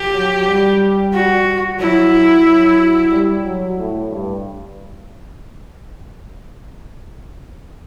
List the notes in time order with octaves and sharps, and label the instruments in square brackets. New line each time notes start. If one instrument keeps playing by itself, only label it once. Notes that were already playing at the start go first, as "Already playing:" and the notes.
Already playing: [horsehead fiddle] G4
[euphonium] F#3
G3
[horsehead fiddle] F#4
[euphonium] F#3 [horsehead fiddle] E4
[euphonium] F#3
G3
F#3
A2
G2